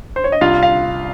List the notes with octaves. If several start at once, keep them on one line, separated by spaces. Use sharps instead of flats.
C5
C#5
D#5
C2 F4 F5
F5